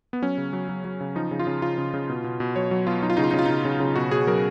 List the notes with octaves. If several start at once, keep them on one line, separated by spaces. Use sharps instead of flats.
B3
F#3 C#4
C#3
F#3
F#3
F#3
C#3
F3 D#4
C#3
F4
C#3
C#3 F4
C#3
C#3
B2
B2
B2
F#3 C#5
F#3
B2 F4
F#3 D#4
F4
C#3 D#4
F4
D#4
C#3
F4
C#3 D#4
C#3
C#3
B2 F#4
B2 G#4
F#3 A#4